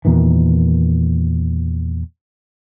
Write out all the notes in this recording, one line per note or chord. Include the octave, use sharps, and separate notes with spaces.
E2 A#2 D#3 E3